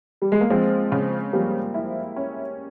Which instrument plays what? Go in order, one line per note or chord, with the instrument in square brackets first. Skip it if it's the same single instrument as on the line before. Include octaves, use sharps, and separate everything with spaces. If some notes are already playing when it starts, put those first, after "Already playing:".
[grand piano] G3
G#3
A#3
[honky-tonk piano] F3 [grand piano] G#3 C4
[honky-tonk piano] C#3
[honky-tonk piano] F3 [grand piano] G3 A#3
[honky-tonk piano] E4
C#4